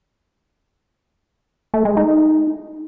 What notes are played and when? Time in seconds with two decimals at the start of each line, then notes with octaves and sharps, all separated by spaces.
1.74 A3
1.85 G#3
1.97 D#4